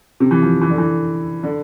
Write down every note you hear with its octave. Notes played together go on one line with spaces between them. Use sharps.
C3
E3
F3
E3
D3
E3
D3